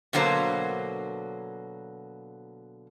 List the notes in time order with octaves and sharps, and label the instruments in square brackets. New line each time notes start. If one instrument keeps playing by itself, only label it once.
[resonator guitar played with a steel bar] B2 D3 F#3 A#3 C5